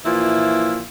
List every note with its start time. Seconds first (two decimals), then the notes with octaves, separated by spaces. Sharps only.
0.06 A#2 E3 F3 E4